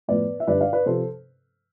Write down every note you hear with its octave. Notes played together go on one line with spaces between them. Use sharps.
A2 F3 B3 B4 D5
E5
G2 D3 G3 D4 B4 D5
D5 F5
B4 D5
C3 F3 C4 A4 C5